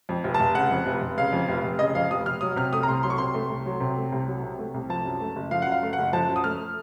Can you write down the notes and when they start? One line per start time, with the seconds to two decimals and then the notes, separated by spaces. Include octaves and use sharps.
0.09 F2
0.24 F1
0.34 A5
0.40 F1
0.55 C#3 F#5
0.71 F2
0.86 F1
1.02 F1
1.17 C#3 F5
1.33 F2
1.49 F1
1.64 F1
1.79 C#3 D#5
1.95 F2 F5
2.11 F1 D#6
2.26 F1 F6
2.41 F#3 D#6
2.56 C3 F6
2.73 A3 D#6
2.83 A#5
2.87 C2 C6
3.03 F#3 C6
3.10 C#6
3.18 C3 C6
3.34 A3
3.50 C2
3.66 F#3
3.80 C3
3.97 A3
4.12 C2
4.28 F#3
4.43 C3
4.59 A3
4.74 C2
4.89 F3 A5
5.05 F#2
5.20 A3
5.36 F#1
5.51 F3 F5
5.62 F#2 F#5
5.72 F5
5.83 A3
5.93 F#5
5.99 F#1
6.13 F3 A5
6.28 F#2
6.36 D#6
6.44 A3 F6